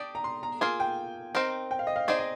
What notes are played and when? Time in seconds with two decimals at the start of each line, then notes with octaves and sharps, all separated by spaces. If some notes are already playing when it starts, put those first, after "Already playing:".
Already playing: D4 G4 D5 D#6
0.15 A#5
0.24 C6
0.43 A#5
0.61 A#3 F4 G#4 G#5
0.80 G5
1.35 C4 D#4 A#4
1.71 G5
1.79 F5
1.87 D#5
1.96 F5
2.08 C4 D#4 G#4 D5 D#5
2.18 D#5